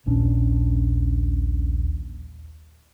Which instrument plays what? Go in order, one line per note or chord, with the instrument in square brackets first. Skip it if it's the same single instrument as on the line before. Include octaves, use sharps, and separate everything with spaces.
[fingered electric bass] D#1 A#1 C#4 D4